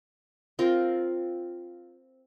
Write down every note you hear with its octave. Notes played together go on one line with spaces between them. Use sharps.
C4 F4 A#4